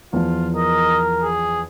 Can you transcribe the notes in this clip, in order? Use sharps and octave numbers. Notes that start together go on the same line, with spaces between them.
E2 F3 F4
A#4 D#5
G#4